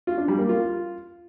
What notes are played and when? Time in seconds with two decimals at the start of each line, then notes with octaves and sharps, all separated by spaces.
0.07 F4
0.18 D4
0.28 G3
0.39 A#3
0.49 F4